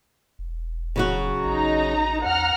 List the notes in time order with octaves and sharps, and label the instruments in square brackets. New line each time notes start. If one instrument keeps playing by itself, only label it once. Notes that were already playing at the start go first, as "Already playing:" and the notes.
[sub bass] E1
[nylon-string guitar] C#3 F#3 F#4
[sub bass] A1 [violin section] D#4 A#5
[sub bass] E2 [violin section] F#5 A#5 F6